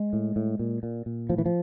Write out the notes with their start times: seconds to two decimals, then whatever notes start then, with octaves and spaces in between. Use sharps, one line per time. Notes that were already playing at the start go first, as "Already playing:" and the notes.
Already playing: G#3
0.13 A2
0.36 A2
0.59 A#2
0.83 A#2
1.06 A#2
1.30 A2 F3
1.38 E3
1.46 F3